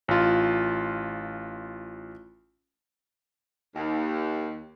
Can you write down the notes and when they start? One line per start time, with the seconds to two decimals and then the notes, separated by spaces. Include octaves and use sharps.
0.08 A1 F4
3.76 D#2